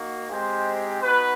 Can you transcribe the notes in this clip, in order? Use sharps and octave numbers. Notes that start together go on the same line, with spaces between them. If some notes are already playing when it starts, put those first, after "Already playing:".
Already playing: A#3 D#4 F#4
G#3 C4 D#4 G4 C5
B3 D#4 F#4 B4